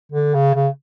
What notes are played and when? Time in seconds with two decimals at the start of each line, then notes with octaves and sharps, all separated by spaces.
0.12 D3
0.34 C#3
0.55 C#3